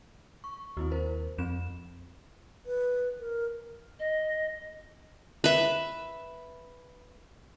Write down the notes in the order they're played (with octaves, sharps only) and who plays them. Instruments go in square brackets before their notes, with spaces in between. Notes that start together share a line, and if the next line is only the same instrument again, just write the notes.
[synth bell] C#6
[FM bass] D#2 [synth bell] C4 E4 F#4
[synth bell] A#4 C5
[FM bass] F2 [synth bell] C4 E7
[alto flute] B4
A#4
[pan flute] D#5
[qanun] B4 E5